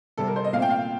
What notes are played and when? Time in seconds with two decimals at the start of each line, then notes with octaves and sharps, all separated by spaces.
0.18 C3 G3 C4 A4
0.27 A#4
0.36 C5
0.44 D#5
0.53 A#2 A3 C4 F5
0.62 G5
0.70 F5